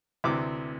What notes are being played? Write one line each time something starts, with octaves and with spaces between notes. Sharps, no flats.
D2 C3 E3 D6